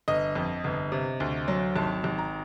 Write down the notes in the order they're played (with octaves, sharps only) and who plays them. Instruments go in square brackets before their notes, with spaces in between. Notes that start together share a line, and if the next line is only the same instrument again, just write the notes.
[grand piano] G1 D#5
F2
G1
C3
D2
F#3
G#1 A5
G#1
A#5